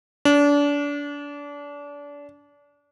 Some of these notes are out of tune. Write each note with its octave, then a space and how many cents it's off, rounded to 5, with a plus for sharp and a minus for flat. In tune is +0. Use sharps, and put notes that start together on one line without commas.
D4 -30